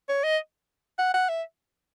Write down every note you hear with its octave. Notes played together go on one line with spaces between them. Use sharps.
C#5
D#5
F#5
F#5
E5